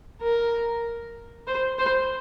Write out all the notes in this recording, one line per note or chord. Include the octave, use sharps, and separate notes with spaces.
A#4
C5
C5